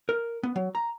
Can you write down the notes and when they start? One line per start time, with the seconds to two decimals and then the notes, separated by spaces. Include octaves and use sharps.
0.09 A#4
0.43 B3
0.56 F#3
0.75 A#5